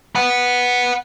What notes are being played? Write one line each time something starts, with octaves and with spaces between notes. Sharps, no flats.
F#5 B5